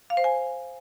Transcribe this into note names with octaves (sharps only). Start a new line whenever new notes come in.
F5
C5
G#5